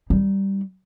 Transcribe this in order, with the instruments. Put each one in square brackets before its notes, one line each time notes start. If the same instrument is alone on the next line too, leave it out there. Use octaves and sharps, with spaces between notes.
[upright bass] G3 D#4